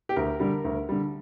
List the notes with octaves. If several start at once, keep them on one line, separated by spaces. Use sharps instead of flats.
G4
D2 A#4
D3 G3
D2
D3 G3